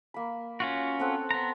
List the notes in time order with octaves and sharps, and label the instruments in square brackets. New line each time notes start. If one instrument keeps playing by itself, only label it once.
[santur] A#3 B5
[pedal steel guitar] C#4 F4 F#4
[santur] C4 A4 F#5
[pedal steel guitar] B3 A#5